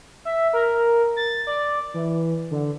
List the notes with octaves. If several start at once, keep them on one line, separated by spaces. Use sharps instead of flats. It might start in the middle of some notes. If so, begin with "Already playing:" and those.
E5
A#4
A6
D5
E3
D3